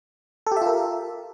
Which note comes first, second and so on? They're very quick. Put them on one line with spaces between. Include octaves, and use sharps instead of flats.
A4 G4 E5 F4 A#4